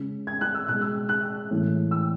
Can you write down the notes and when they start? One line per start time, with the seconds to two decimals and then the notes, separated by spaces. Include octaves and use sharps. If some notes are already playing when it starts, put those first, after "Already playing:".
Already playing: C#3 G#3
0.27 G#6
0.41 F#6
0.54 E6
0.68 B2 G#3 F#6
0.81 E6
1.09 F#6
1.51 A2 E3 G#3
1.91 E6